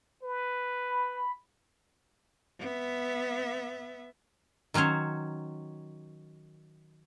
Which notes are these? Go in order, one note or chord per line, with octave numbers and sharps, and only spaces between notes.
B4
B5
B3 E5
D#3 F#3 C#4 C5 C#5